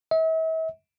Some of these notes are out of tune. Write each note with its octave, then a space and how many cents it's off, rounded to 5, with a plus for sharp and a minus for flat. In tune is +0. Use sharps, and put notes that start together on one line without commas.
E5 -40